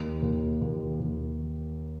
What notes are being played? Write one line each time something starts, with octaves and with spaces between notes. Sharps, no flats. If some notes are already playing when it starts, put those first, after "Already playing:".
Already playing: D#2
D#2
D#2
D#2